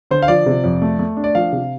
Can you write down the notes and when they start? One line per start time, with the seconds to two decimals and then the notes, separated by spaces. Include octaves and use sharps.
0.11 D3 C5
0.22 F5
0.28 F3 D5
0.46 C3
0.64 F2
0.82 A3
0.99 A3
1.17 D4
1.24 D5
1.35 F3 F5
1.52 C3